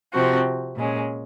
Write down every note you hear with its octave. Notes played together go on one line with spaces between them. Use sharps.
C3 F3 C4 F#4
A#2 G#3 C#4